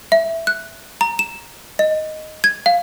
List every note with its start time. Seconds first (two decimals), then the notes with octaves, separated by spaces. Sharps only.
0.12 E5
0.47 F#6
1.01 A#5
1.19 E7
1.79 D#5
2.44 G#6
2.66 F5